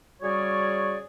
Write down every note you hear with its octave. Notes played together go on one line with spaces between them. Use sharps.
C#3 G3 F#4 G#4 C#5 D5